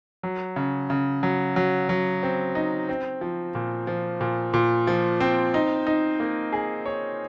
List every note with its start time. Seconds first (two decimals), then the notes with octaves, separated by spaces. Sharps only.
0.23 F#3
0.56 C#3
0.90 C#3
1.23 F#3
1.56 F#3
1.89 F#3
2.23 C4
2.55 D#4
2.89 C4
3.21 F3
3.55 A#2
3.87 F3
4.21 A#2
4.54 A#2
4.87 F3
5.20 C4
5.54 D#4
5.87 D#4
6.20 A#3
6.53 G#4
6.86 C#5